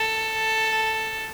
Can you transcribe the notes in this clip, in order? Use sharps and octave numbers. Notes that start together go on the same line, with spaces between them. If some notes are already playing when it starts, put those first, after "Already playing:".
Already playing: A4